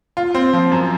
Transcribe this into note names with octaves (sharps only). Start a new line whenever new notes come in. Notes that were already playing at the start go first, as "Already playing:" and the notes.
F4
C4
F3
F#2